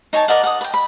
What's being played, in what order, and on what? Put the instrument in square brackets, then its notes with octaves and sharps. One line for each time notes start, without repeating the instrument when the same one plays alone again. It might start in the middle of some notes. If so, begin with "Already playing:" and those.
[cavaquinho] D#4 C#5 G#5 A5
A#4 D5 D#5 F#5
F#5 D#6
B4 G5
B5